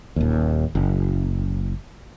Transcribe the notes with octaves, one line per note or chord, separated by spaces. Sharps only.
D#1 D#2
F#1